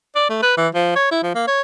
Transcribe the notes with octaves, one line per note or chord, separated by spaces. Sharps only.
D5
A3
B4
E3
F3
C#5
E4
F3
A#3
C#5